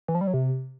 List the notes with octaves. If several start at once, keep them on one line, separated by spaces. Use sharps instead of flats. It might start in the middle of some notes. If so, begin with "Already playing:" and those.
E3
F3
G3
F#3
C3